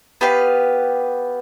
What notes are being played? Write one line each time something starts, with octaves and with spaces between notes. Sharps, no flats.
B3 G4 B4 F5